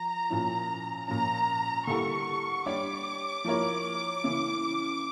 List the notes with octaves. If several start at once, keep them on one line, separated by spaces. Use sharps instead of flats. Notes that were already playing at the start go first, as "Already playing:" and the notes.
Already playing: F3 A#5
A#2 F3 C#4 E4
A#2 F3 C#4 A#5
D3 G3 A#3 E4 A4 C#6
G3 D4 G4 C#5 D6
F3 A#3 E4 A#4 C#5
C#3 E3 A#3 C#4 E4